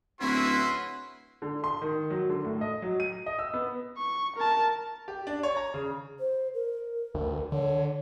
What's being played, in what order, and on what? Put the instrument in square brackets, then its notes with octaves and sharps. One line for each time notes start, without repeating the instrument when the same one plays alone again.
[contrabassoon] D1 [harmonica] C#4 F#4 B4 [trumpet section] E4 E5 [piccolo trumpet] C6
[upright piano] D3
C6
D#3
F#3
D3
A2
D#5
F#3
D#7
D#5
E6
B3
[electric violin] C#6
A#4 A5
[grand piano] G4
D4
C#5
A#5
C#3
[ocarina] C5
A#4
[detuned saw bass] D2
[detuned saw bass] D3 [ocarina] C#5